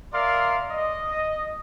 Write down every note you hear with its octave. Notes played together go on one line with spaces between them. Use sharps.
A#4 D5 E5 F5 A#5 C6
D#5